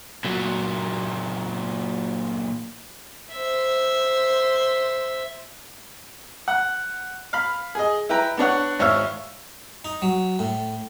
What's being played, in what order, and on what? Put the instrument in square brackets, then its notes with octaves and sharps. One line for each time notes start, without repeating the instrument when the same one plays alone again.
[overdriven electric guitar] A#2 F#3
[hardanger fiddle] C5 E5
[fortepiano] F#5
F5 B5
G#4 D#5
E4 B4 G5 A#5
B3 D4 C#5 F#5
G#1 C#5 E5 F5
[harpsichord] D#4
F#3
A2